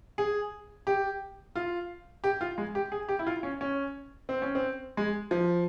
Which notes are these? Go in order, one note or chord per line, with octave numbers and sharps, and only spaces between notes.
G#4
G4
F4
G4
F4
G#3
G4
G#4
G4
E4
F4
C#4
C#4
C4
C#4
C4
G#3
F3